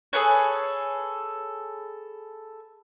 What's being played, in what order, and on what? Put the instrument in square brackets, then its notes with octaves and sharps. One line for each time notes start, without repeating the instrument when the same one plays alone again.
[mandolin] G#4 A4 B4 C#5